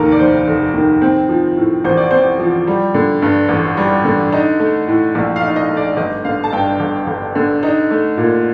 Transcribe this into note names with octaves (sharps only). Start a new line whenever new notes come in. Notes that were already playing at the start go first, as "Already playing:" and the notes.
Already playing: F1 D#2 D#3 A4 A#4
D5
F1 C5
F1
D#3
C4
F3
A2
A1 C5
D5
C4 C5
F3
G3
D3
G2
A1
G3
D3
D#4
A3
A2
A#1
F5
D#4
D#5
A3
D5
G1 D#5
D3 F5
A5
G2 G5
G1
G1
D3
D#4
A3
A#2